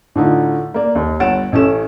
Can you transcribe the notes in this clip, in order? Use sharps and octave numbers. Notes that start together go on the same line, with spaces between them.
A2 D3 D#4 F4
A#3 D5
D#2
G1 C#5 F#5 A6 D7 E7
A1 C#4 A4 E7